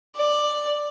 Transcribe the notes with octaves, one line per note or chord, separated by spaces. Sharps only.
D5